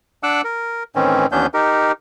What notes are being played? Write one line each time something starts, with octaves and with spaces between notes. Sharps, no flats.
D4 F#5 D6 E6 F#6
A#4
A2 D#3 E3 C4 C#4
D#2 E3 B3 C#4 D4 G6
D#4 G4 A#4